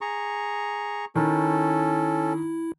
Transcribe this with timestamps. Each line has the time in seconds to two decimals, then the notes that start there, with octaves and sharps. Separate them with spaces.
0.01 G#4 A#5 C#6
1.16 D#3 C#4 E4 A4